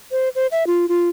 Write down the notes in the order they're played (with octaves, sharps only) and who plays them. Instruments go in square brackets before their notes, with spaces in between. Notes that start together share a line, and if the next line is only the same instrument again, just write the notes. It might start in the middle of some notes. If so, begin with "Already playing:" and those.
[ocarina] C5
C5
E5
F4
F4